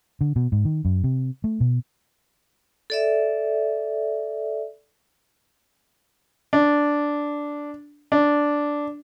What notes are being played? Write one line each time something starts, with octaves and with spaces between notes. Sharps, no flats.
D3
B2
G#2
D#3
F#2
C3
A3
B2
A4 D5 E5
D4
D4